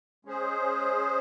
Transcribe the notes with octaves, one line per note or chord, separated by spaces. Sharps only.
G#3 C#4 G#4 C5